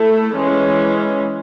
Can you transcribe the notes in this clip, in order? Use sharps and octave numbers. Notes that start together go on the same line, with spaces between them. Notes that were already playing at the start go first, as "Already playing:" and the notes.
Already playing: A3 E4 A4
E3 G#3 C#4